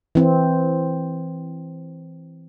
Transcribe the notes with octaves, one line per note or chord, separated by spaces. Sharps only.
E3 C4